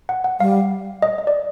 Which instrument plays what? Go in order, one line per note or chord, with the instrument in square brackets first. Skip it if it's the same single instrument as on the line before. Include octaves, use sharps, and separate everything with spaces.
[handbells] F#5
F#5
[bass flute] G3 [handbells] F5
[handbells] D#5
D#5
D5